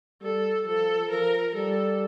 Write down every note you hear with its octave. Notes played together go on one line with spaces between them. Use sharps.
G3 A4
F3 A4
F3 A#4
G3 A4